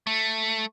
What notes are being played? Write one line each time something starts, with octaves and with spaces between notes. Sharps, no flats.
A3